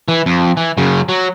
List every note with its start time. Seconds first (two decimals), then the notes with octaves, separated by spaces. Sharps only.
0.08 E3
0.26 F2
0.57 E3
0.77 F#2 C#3
1.09 F#3